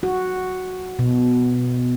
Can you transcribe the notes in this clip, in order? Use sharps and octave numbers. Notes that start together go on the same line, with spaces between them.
F#4
B2